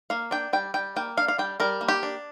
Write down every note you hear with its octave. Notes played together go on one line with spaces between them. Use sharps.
A#3 F5
D4 G5
G3 G5
G3 G5
A#3 G5
D4 F5
F5
G3 G5
G3 A#4
A#3
G4
D4